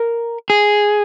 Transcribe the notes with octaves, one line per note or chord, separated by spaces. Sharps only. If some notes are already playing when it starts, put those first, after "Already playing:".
Already playing: A#4
G#4